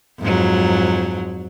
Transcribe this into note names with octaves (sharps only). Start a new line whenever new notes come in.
F2 G#2 F#3